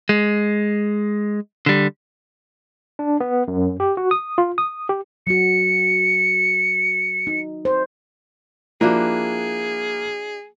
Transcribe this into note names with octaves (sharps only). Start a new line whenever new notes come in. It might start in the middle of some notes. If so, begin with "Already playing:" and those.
G#3
D3 G3
D4
B3
F#2
G4
F#4
D#6
F4
D#6
G4
F#3 F#4 C#7
D#4
C5
F3 A#3 D4 E4 F#4 G#4